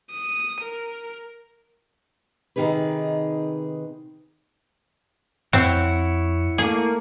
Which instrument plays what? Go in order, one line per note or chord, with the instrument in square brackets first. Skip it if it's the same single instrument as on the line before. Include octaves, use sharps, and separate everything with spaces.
[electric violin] D#6
A#4
[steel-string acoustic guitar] C3 D#3 D#4 G#4 B4
[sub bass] F2 [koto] C4 [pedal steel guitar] E4 C#5 F#5
[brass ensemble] A3 A#3 [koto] G#4